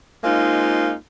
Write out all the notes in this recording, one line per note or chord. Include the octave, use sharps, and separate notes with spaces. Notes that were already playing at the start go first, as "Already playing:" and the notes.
G#3 A#3 C4 D#4 F4